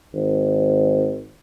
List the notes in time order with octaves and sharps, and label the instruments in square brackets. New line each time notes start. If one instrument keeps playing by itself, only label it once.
[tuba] G#1